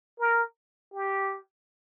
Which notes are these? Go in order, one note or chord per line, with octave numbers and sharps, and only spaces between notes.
A#4
G4